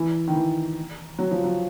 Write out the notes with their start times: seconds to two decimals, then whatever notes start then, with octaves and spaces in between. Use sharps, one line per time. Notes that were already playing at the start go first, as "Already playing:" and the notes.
Already playing: E3
0.28 D#3
0.35 E3
1.19 F#3
1.31 F3
1.44 F#3